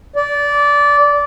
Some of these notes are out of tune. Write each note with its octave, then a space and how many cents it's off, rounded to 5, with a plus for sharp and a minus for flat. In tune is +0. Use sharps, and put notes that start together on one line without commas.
D5 -20